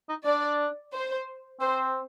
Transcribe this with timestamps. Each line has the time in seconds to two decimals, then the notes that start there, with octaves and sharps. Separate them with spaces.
0.09 D#4
0.25 D4 D5
0.93 C5
1.60 C4 C5